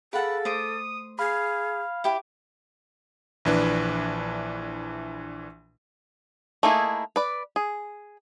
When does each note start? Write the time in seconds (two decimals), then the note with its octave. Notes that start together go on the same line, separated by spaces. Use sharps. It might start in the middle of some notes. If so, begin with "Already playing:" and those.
0.13 G#4 A4 B4 F5 F#5
0.45 A3 C5 D6 D#6
1.19 G#4 F5 B5 G#6
2.04 E4 G4 D6
3.45 A#1 E3 D4 B4
6.63 A3 A#3 D#4 E4 G#4
7.16 B4 D5
7.56 G#4